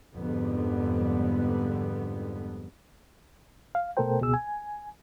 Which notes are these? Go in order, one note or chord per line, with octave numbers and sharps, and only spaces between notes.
F2 G#2 D3 G3 B3
F5
B2 A3 A4 A#4 C5 G5
C#2 B2 B3 G#4 E6
G#5